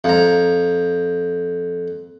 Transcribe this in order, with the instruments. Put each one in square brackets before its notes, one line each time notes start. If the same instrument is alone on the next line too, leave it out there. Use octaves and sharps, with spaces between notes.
[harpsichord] F2 A#5